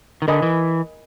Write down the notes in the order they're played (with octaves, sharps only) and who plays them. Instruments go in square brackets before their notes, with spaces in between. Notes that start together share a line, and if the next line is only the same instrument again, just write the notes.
[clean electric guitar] D#3
[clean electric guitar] D3 [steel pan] A#4 D#5 G#5 B5
[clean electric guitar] E3